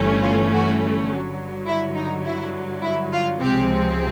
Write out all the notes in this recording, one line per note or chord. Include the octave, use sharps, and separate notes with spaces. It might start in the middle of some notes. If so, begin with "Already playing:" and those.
Already playing: G1 G2 E3 A3 C#4
F4
F#4
G2 D3 F#3
E4
D#4
E4
E4
F4
C#2 C3 F3 G#3 C4 G4